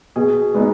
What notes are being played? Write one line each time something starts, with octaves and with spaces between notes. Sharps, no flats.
B2 G#4
G#3 B3 D#4